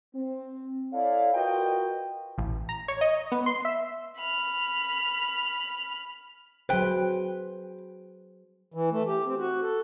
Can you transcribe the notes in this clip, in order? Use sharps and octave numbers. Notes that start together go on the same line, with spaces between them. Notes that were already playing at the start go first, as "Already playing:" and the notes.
C4
E4 A4 C#5 D5 F5
F4 F#4 A#4 B4 D#5 G5
A1
A#5
C#5
D#5
B3
C6
E5
B5 F6
F#3 G#4 B4 C5 G5
E3
A3
G4
C4
F#4
A4